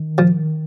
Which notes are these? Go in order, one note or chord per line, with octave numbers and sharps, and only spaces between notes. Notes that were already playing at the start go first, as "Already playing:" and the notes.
Already playing: D#3
F3